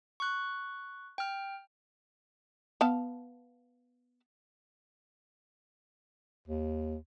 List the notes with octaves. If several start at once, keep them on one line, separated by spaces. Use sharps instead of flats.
C#6 F#6
G5 F6
B3 F5 A5
D#2